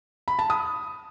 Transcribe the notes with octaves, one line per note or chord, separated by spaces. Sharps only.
B5
A5
D#6